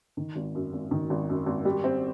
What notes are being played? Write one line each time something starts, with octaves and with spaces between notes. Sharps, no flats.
D#3
G#1
F#2
G#1
D#3
G#1
F#2
G#1
G3
C4